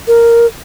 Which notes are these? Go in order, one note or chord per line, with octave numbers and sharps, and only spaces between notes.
A#4